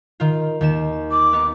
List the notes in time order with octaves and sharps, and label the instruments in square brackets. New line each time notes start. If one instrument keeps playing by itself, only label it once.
[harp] D#3 F4
D#2 D#3 E7
[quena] D6
[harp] B3 D#4